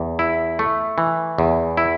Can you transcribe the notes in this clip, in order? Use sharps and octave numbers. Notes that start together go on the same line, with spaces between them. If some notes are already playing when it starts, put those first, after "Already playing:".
Already playing: E2
E4
A3
E3
E2
E4